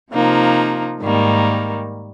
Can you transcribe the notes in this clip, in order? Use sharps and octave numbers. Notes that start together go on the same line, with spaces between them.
C3 F3 A#3 D#4
G#2 D#3 G3 A#3